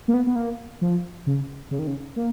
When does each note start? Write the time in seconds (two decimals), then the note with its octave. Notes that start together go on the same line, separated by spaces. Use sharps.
0.08 A#3
0.14 B3
0.27 B3
0.36 A#3
0.81 F3
1.27 C#3
1.71 C#3
1.79 D#3
1.87 C#3
2.16 A#3